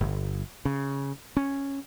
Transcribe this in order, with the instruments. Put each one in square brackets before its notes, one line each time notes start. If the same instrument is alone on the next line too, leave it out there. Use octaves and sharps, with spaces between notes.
[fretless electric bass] G1
C#3
C#4